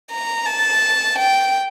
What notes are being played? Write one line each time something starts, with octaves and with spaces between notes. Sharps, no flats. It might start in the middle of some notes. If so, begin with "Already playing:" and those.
A#5
A5
G5